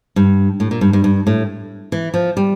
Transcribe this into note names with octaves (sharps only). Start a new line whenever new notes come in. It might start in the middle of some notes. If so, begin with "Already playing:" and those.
G2
A2
A#2
G2
G2
G2
A2
E3
F3
G3